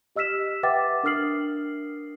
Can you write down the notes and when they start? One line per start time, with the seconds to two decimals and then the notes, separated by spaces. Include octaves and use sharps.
0.16 G4 D#5 E6 F6 B6 E7
0.63 B4 E5 F#5 G5 D6 A6
1.03 D4 A#4 D#6 F6 C7 F#7